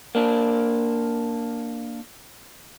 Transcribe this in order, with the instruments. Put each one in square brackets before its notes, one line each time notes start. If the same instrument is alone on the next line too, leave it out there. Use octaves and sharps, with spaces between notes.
[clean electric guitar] A#3 D4